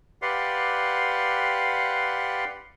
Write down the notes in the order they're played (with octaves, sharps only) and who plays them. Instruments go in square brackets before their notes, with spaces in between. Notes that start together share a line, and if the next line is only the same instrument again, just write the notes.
[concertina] G4 B4 D5 F5 F#5 C6